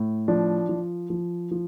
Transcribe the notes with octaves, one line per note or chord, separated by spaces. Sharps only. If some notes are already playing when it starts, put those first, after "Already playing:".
Already playing: A2
F3 D4
F3
F3
F3